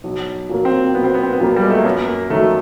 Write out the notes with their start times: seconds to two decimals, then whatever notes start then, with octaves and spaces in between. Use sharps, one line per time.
0.04 B1
0.49 A#2 F#3 A#3
0.65 C4
0.95 B1 B3
1.04 C4
1.14 B3
1.23 C4
1.33 B3
1.40 A#2 F#3 A#3
1.56 G3
1.63 G#3
1.71 A3
1.78 A#3
1.85 F#2 B3
2.08 A#3
2.30 D#3 F#3 A3